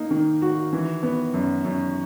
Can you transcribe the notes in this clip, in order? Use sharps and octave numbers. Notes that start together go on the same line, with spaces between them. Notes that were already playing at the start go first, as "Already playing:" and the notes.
Already playing: A#3 D#4
D#3
F#4
E3
B3
F#2
F#2